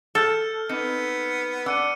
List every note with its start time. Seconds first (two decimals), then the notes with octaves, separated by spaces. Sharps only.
0.15 A4 E6 F6 G6
0.69 B3 C4 D#4 C#7
1.66 D4 F#5 E6 C#7 D#7